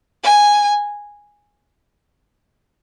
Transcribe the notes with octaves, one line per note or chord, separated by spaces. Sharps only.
G#5